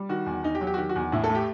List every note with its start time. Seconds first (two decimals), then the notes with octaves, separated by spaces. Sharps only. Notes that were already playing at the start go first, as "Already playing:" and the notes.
Already playing: G3
0.09 D#3 F#4
0.26 E2
0.43 E2 D#4
0.55 G4
0.61 F#3
0.67 G4
0.74 F#4
0.78 D#3 G4
0.89 F#4
0.96 E2
1.12 A2 E4
1.24 A4
1.30 A3
1.35 G4